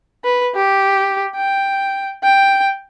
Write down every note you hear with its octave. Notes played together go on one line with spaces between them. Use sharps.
B4
G4
G5
G5